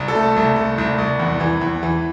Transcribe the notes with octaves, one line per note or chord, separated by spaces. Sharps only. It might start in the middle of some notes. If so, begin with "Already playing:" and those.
Already playing: C2
A4
A3
C2
A3
C2
C2
E2
E3
E2
E3